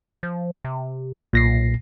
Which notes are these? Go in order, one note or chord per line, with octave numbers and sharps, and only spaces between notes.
F3
C3
B1 A#2 A#6 C7